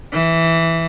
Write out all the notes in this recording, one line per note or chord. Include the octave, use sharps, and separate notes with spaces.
E3